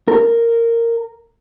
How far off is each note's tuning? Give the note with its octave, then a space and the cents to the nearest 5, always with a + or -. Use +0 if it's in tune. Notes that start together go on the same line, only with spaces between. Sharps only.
A#4 -10